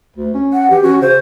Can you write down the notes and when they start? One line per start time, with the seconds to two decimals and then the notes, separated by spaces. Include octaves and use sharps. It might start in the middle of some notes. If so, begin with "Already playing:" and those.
0.16 D2
0.34 C#4
0.53 F#5
0.70 E3 G4
0.83 C#4 F#4
1.01 C#3 C5